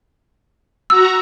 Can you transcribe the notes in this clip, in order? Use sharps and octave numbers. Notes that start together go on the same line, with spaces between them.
F#4 A#5 E6